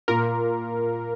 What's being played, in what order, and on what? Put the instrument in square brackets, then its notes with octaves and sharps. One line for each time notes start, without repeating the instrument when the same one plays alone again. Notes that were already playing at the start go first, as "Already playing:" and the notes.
[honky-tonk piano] A#2 [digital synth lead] A#4